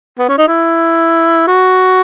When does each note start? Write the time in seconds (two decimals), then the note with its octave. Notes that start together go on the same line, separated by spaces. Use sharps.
0.19 B3
0.29 C#4
0.38 D#4
0.48 E4
1.47 F#4